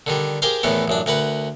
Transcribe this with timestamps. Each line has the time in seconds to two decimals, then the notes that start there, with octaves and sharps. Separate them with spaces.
0.07 D3 D#3 G3
0.42 G4 G#4 A#4 C5 F5
0.63 E2 A2 D#3 E3 B3
0.88 A1 F#2 D4
1.06 D2 A#4 B4 F#5